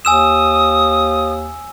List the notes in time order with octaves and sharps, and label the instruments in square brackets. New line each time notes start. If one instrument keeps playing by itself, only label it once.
[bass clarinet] D#2 [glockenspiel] G#5 E6 E7 [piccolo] D#6